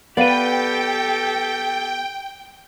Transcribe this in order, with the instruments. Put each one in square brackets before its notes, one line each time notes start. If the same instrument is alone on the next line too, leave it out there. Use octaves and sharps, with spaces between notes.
[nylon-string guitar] B3 F5 [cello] G4 A4 [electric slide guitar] B4 D5 [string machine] G5